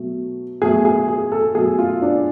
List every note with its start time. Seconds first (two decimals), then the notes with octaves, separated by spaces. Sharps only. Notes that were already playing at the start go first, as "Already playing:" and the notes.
Already playing: B2 F#3 A3
0.62 B2 F#3 A3 G#4
0.85 G#4
1.09 G#4
1.32 A4
1.55 B2 F#3 A3 G#4
1.78 F4
2.02 D4